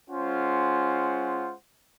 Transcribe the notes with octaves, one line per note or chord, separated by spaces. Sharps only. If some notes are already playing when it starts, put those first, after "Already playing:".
G#3 C#4 F4 C5 F#5